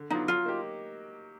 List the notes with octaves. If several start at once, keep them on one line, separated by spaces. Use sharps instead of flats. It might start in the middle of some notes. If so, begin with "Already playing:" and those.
Already playing: D3
F#3 B3 D4 D#4 F4
F#3 F4
A#3 D#4 G4